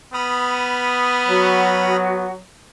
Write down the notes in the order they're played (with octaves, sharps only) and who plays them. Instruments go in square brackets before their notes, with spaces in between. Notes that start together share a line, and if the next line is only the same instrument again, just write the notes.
[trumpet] B3 [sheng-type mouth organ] B5 D#6 F6
[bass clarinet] F#3 [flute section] F#4